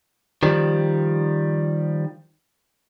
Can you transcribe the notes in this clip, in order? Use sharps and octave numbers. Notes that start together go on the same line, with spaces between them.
D#3 F3 G3